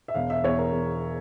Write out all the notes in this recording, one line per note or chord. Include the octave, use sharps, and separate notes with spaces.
E5
E1 F5
E5
E2 C#5
A#4
E2